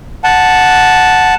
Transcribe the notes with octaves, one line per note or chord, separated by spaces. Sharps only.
F#5 A5